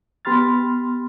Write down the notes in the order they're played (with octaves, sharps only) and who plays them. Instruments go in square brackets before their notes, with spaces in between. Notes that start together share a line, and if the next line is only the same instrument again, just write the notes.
[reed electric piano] B3 G4 B5 C6 F6 A6